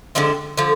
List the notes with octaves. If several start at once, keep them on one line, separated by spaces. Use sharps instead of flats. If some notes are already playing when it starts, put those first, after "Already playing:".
D3 F3 G#3 C4
D3 F3